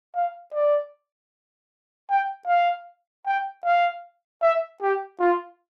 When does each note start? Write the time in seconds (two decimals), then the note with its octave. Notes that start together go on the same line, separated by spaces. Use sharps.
0.15 F5
0.54 D5
2.10 G5
2.48 F5
3.26 G5
3.65 F5
4.42 E5
4.82 G4
5.20 F4